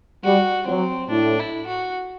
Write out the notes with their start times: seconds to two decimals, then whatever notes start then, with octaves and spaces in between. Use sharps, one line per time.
0.24 G3 F#4
0.67 F#3 C4
1.10 A2 D4
1.39 E4
1.67 F#4